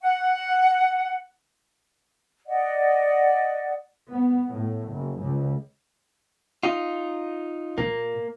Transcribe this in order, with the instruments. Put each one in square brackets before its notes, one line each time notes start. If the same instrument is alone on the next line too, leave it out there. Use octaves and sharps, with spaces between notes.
[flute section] F#5
D5 D#5 F#5
[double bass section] B3
A2
F#1
C#2
[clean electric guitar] D#4 F4
[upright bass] A#2 [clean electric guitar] A#3